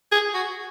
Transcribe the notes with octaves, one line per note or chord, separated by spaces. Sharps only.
G#4
F#4